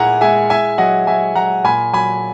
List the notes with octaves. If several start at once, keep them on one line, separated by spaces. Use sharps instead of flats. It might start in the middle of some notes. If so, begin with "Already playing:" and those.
Already playing: A#2 G#3 E4 E5 F#5 G#5 A#5
G#3 E5 G#5
E4 E5 G#5
F#3 D#5 F#5
F#3 E5 G#5
F#3 F#5 A#5
A#2 G#5 B5
F#3 G#5 B5